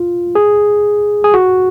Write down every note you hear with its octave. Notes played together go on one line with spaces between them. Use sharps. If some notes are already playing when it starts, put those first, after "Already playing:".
Already playing: F4
G#4
G#4
F#4